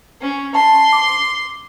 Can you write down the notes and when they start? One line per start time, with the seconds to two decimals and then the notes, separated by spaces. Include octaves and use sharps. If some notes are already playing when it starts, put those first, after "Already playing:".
0.21 C#4
0.55 A5 C6
0.93 D6